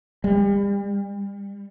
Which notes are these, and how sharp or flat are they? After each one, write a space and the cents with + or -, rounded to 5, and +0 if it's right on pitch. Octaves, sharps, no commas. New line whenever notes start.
G3 +35